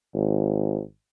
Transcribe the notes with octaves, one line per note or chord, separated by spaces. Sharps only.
G#1